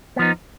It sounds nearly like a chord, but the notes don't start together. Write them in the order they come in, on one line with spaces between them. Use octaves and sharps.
B3 F3 D#4